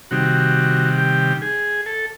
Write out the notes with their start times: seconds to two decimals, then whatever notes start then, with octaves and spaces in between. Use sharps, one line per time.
0.11 C3 D#3 G3 F#4
0.98 G4
1.42 G#4
1.86 A4